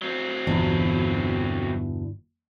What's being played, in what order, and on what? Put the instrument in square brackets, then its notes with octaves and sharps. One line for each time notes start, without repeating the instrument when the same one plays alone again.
[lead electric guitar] F#3 C4
[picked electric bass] G1 [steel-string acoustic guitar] E2 B2 E3